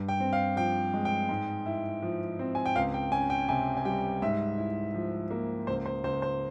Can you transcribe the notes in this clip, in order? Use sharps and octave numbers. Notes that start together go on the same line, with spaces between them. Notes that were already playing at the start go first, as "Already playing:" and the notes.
Already playing: G2
G5
C4
F5
F3 G5
G#3
G5
G#2
E4
F3
C4
G#5
G5
C#2 F5
G5
C#4 G#5
G5
C3 G#5
G#5
G3 G5
G#2 E5
E4
F3
A#3
C#2 C5
C5
C#2 C5
C5